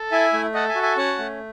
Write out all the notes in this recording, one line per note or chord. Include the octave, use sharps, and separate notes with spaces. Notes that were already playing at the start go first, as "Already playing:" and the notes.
Already playing: A4
E4 E5 G#5
A3
A4 D#5 F#5
E5 G#5
F#4
E5 G#5
C#4 F#5 A5
A3